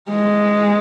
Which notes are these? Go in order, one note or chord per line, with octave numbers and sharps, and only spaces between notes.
G#3